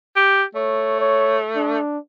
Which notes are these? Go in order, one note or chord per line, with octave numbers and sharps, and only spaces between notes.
G4
A3 C#5
C#5
D4